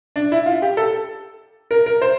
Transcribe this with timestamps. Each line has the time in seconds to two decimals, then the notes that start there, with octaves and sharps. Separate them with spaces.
0.16 D4
0.32 E4
0.46 F4
0.62 G4
0.77 A4
1.71 A#4
1.86 A#4
2.02 C5